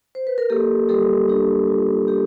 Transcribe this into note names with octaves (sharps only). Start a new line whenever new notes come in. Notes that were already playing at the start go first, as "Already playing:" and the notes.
C5
B4
A#4
A#3 G4 A4
G3 G4 A4
D4 G4
F4
A#3 G4